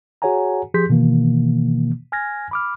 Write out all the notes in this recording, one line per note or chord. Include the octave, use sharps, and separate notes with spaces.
F#4 G#4 C#5 F#5 G#5 A#5
F3 G4 G#4 C6 G6 B6
B2 D#3 E3 A#3
G#5 F6 G#6 A#6
B5 D6 F6